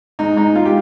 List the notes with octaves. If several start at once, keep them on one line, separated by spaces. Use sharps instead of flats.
G#2 D#4
G#2 D#4
G#2 F4
G4